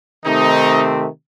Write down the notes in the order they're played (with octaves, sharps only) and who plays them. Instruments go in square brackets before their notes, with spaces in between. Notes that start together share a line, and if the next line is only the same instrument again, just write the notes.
[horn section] C3 D#3 A3 C4 D#4